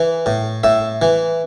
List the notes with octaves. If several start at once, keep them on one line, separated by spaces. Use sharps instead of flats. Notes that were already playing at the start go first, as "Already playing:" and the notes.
Already playing: E3
A2
A2 E5
E3